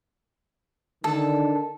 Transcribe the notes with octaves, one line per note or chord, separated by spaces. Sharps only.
D3 D#3 D4 A4